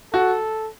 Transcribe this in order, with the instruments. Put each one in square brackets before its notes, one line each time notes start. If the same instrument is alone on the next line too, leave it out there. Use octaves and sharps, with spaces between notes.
[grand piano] F#4 [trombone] A4